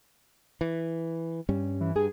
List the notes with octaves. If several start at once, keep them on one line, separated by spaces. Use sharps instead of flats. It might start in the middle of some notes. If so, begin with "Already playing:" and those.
E3
G2 G3 C#4
E3
G2 G#4